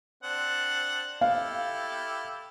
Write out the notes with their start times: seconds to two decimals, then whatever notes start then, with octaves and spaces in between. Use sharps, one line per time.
0.23 C4 D4 F#5
1.21 E4 G4 A4 F5